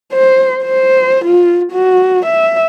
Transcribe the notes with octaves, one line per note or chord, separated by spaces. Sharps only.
C5
C5
F4
F#4
E5